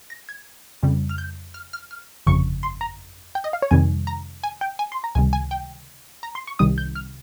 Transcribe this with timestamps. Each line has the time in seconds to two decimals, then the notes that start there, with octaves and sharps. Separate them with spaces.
0.10 A#6
0.29 G#6
0.83 F2 C#3 G3
1.09 F6
1.18 G6
1.54 F6
1.73 F6
1.91 F6
2.27 G1 F2 C#3 C#6
2.63 C6
2.81 A#5
3.35 G5
3.44 D#5
3.53 F5
3.62 C#5
3.71 F2 C3 D#3 G3 G#5
4.07 A#5
4.44 G#5
4.61 G5
4.79 G#5
4.92 C6
5.04 A#5
5.15 C#2 C3 D#3 G3 G#5
5.33 G#5
5.51 G5
6.23 A#5
6.35 C6
6.47 C#6
6.59 C2 C3 D#3 G3 D#6
6.78 G6
6.95 F6